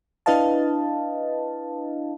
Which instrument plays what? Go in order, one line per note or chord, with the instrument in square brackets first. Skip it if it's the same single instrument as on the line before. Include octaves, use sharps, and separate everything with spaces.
[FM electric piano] D4 E4 B4 D#5 F5 A5